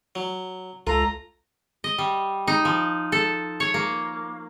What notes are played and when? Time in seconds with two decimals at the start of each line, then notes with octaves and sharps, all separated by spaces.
0.15 F#3
0.87 C#2 F4 A4 A#5
1.84 D#5
1.98 G3
2.47 D#4
2.65 F3
3.12 A4
3.60 C#5
3.74 A#3